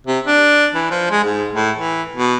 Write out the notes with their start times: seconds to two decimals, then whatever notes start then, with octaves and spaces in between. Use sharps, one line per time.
0.07 C3
0.27 D4
0.75 E3
0.91 F3
1.11 G#3
1.24 G#2
1.53 A2
1.77 E3
2.16 B2